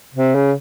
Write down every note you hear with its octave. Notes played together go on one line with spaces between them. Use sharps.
C3
C#3